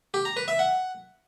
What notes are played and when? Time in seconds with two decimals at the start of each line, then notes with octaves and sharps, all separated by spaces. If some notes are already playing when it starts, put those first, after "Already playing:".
0.14 G4
0.25 A#5
0.37 B4
0.48 E5
0.59 F#5